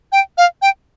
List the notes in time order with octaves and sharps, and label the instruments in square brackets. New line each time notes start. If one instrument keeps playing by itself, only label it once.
[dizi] G5
F5
G5